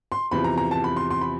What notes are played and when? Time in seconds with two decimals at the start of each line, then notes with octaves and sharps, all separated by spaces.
0.12 C6
0.31 E2 C3 F3 B5
0.44 A#5
0.58 A#5
0.71 A5
0.84 B5
0.96 C6
1.11 C6
1.21 B5